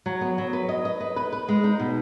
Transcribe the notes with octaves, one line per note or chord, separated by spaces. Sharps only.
F#3
B3
F#3
B4
D#5
D#5
B4
B4
B4
G#3
D#4
B2